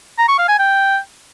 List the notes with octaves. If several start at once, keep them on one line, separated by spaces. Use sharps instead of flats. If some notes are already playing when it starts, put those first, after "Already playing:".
A#5
C#6
F5
G#5
G5